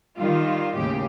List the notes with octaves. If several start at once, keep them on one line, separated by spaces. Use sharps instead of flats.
D#3 G3 F4
D#2 A2 C#3 G4